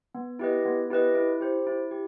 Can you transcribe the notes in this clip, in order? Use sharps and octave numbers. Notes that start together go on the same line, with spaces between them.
B3
E4 G4 B4 D#5
B3
E4 G4 B4 D#5
E4
G4 C5
E4
G4